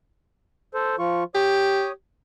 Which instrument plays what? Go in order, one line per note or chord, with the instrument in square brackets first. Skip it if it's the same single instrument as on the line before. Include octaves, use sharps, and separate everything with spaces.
[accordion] A4 C5
F3 F4 C#6
[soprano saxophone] G4 [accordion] C#5 D#6